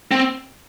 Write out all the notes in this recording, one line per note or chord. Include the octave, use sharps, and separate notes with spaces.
C4